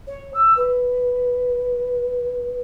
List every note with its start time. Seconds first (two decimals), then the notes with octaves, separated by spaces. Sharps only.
0.07 C#5
0.34 E6
0.56 B4